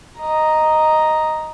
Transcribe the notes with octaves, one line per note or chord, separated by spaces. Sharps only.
D#5 A#5